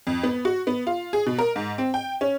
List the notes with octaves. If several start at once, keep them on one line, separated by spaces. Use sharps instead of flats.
F2
B3
F#4
B3
F4
G#4
B2
A#4
G#2
C4
G5
C#4